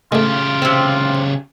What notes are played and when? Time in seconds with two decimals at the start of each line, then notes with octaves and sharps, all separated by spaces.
0.12 C#3 G#3 A3 F4 G4
0.62 C3 C4